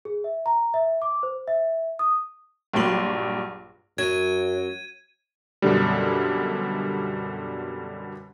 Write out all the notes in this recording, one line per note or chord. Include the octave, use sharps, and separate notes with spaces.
G#4
E5
A#5
E5
D6
C5
E5
D#6
A#1 G2 F#3 C6 F#7
F#2 F#3 G#6 D#7
F#2 B2 D3 G3